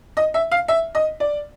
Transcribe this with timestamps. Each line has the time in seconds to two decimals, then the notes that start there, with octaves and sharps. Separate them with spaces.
0.17 D#5
0.34 E5
0.51 F5
0.68 E5
0.95 D#5
1.20 D5